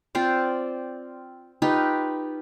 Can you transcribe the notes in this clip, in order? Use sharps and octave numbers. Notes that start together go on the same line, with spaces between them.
C4 F4 C5 D5
D#4 F4 G4 B4